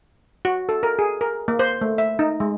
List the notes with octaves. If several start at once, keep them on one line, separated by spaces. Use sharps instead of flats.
F#4
A4
A#4
G#4
A#4
A#3
C5
A3
E5
D#4
G#3